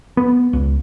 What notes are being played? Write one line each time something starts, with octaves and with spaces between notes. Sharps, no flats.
B3
C#2